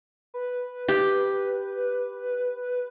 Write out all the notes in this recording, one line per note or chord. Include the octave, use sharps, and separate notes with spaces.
B4
G4